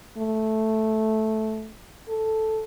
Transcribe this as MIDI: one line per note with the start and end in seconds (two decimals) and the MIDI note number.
0.18 1.71 57
2.09 2.63 69